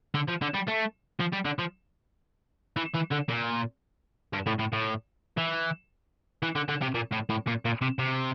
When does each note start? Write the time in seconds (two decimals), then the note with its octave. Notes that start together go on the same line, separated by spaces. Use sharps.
0.14 D3
0.28 F3
0.41 D3
0.54 G3
0.68 A3
1.20 F3
1.33 G3
1.45 D3
1.59 F3
2.76 E3
2.94 E3
3.11 D3
3.29 A#2
4.33 G2
4.46 A2
4.59 A2
4.73 A2
5.38 E3
6.43 E3
6.56 D3
6.69 D3
6.82 C3
6.95 A#2
7.12 A2
7.29 A2
7.47 A#2
7.65 A#2
7.82 C3
7.99 C3